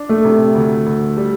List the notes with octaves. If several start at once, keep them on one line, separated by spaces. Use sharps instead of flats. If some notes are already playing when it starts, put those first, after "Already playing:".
Already playing: D4
A3
C3
D2
D2
G3